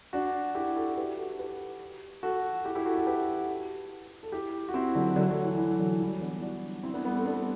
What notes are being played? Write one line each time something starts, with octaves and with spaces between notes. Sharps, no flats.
D4 F#4
E4 G4
F#4 A4
G4 B4
F#4 A4
G4 B4
F#4 A4
E4 G4
E4 G4
F#4 A4
F#4 A4
G4 B4
A4
E4 G4
F#4
C4 E4
D3 F#3
D3 F#3
F#3 A3
E3
E3
D3 F#3
E3 G3
B3 D4
D4 F#4
C4 E4
B3 D4
G3 B3
A3 C4
B3 D4